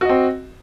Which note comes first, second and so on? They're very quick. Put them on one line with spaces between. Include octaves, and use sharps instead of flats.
F#4 D#5 C4